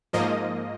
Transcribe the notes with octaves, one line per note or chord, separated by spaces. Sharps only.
G#2 F3 A#3 D#5